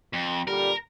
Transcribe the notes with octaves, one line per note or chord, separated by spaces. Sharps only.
F2
A#2 D3 G3 A#4